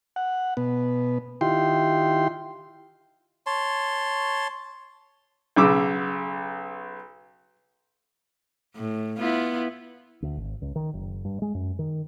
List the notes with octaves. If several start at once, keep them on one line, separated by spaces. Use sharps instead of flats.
F#5
B2 B3
D#3 E4 F4 G4 G5 C6
C#5 A5 C6
B1 C#3 D6 E6
A2
B3 E4 F4
D2
G#1
C#2
D#3
F#1
G2
G#3
F#2
D#3